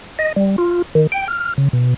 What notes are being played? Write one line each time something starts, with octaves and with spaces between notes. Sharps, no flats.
D#5
G3
F4
D#3
G5
F6
C#3
B2